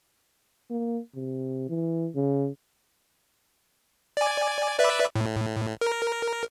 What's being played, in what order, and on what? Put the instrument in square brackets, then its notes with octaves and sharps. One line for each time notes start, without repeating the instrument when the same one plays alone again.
[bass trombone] A#3
C3
E3
C#3
[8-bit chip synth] D5 G#5
B4 D5 E5
A2
A#4